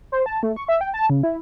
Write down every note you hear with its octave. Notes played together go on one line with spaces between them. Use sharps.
C5
A5
A3
C#6
E5
G5
A5
C#3
E4